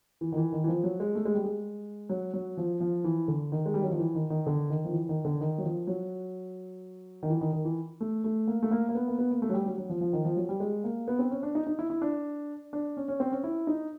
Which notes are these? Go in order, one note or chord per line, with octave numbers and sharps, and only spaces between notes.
E3
D#3
E3
D#3
E3
F3
F#3
G#3
A3
G#3
G3
G#3
F#3
F#3
F3
F3
E3
D3
D#3
G#3
G3
F#3
F3
E3
D#3
D#3
D3
D#3
F3
E3
D#3
D3
D#3
F#3
F3
F#3
D#3
E3
D#3
D#3
E3
A3
A3
A#3
A3
A#3
A#3
B3
A#3
B3
A#3
A3
F#3
G3
F#3
F#3
F3
F3
D#3
F3
F#3
G3
G#3
A#3
B3
C4
C#4
D4
D#4
D#4
E4
E4
D4
D4
C#4
C#4
C4
C#4
E4
D#4